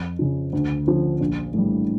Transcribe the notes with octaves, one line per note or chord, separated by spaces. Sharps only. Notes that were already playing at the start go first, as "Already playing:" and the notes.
Already playing: F2
C#3 F3
D2
D3 F3 C#4
A#1
A2 E3 G3